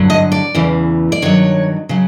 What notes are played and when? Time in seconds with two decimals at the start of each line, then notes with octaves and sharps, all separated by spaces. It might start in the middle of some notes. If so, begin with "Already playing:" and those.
Already playing: G2 D3 F#3
0.10 D#5
0.32 D5
0.55 E2 C#3 E3
1.12 D5
1.22 G2 D#3 F#3 C#5
1.89 C#3 F#3